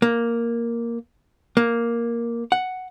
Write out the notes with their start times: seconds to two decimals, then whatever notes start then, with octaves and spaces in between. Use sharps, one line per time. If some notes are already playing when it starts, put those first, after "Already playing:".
0.02 A#3
1.57 A#3
2.52 F#5